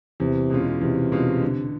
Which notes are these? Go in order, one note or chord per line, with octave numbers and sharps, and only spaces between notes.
E2 C3
B2 G#3 C#4 F4
E2 C3
B2 G#3 C#4 F4
D3